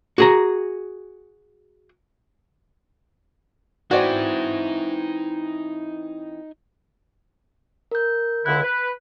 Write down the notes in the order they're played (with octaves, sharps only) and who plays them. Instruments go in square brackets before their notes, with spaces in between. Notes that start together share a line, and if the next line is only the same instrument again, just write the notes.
[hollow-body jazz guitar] F#4 G#4 A#5
[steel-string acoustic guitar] E3 C4 [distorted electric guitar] D#4 G#5 [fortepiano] F#4 D5
[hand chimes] A#4 G6
[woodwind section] C#2 D3 E4 [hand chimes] F#6
[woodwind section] B4